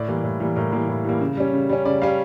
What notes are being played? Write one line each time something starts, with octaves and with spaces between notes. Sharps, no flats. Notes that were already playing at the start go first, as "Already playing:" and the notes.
Already playing: A2 D5
E3 G3 A#3
A2
E3 G3 A#3
A2 A#4
E3 G3 A#3
A2
E3 G3 A#3
C#3
G3 C#4
C#3
G3 C#4
C#3 D5
G3 C#4 F5